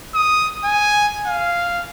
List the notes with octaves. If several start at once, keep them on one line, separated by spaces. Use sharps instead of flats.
D#6
G#5
F5